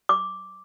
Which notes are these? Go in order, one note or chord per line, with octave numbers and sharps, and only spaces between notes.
D6